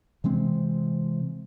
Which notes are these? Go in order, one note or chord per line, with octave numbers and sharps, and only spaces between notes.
C3 E3 G#3 C4